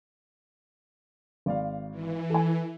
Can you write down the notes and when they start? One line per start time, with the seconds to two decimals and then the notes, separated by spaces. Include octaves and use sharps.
1.46 G#1 D5 F5
1.91 E3
2.30 A4 G#5